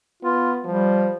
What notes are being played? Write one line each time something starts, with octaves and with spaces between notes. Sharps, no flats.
B3 F4
F3 G3